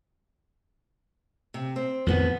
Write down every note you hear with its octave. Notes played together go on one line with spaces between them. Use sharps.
C3
C4
F2 A2 D#3 F3 B3